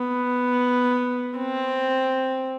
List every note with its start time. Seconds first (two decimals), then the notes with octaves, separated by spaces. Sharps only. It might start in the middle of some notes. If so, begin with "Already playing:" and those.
Already playing: B3
1.38 C4